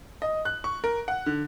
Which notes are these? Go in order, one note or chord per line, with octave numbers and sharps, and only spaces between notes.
D#5
F#6
C#6
A#4
F#5
D3